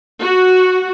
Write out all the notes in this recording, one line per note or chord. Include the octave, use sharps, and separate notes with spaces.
F#4